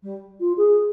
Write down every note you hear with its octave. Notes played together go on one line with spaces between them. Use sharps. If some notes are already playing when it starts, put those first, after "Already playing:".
G3
F4
G#4